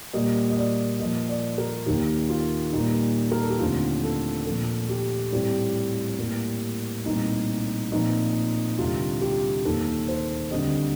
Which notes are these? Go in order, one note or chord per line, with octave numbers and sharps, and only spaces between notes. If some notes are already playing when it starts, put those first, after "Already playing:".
A#2 G3 A#3 D#5
D#5
D5
A#2 F3 A#3 D#5
D5
A#4
D#2 D#3 A#3 G4
F4
A#2 G3 A#3 D#4
A#4
A4
G4
D#2 D3 A3 C4 F4
A4
A#2 F3 A#3 A4
G4
A2 G3 C4
A2 G3 A#3
C2 A#2 A3 C4 D#4
A#2 F3 C4 D#4
D2 C3 G3 F4
G4
D#2 D#3 A#3 A4
C5
D2 D3 G3 C4 D#5